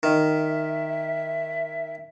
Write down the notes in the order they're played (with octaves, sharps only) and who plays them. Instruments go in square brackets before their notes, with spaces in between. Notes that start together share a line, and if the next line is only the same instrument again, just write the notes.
[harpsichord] D#3 [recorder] E5